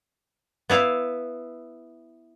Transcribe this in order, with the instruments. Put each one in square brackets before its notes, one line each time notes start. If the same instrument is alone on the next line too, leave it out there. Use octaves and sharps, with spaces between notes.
[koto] B3 E4 F5